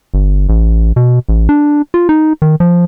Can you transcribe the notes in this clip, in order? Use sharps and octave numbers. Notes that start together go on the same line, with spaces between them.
G1
A1
B2
A1
D4
F4
D#4
D#3
F3